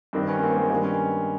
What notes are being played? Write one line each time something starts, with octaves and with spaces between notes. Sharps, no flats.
G2 D#3 C4 D4
B3 C#4
A#3 C4
G#3 A#3
G2 D#3 G#3 A#3
B3 C#4